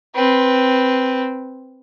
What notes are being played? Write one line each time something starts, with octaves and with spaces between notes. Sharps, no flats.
C4 B4